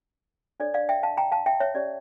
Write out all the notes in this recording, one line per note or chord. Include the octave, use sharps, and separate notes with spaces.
D4 A4 C#5 D5
D5 F5
E5 G5
F5 A5
G5 A#5
F5 A5
E5 G5
C#5 E5
C#4 G4 C#5 D5